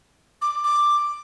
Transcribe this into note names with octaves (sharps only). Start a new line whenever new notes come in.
D6
D6